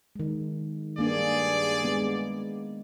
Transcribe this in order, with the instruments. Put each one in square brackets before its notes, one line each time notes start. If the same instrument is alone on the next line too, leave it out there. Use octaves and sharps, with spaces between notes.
[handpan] D#3 G#3
[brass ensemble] G2 G#4 D5 [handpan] A#3 D4
[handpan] G#3 B3